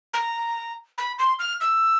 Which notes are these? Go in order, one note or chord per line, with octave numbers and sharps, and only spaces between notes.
A#5
B5
C6
F6
E6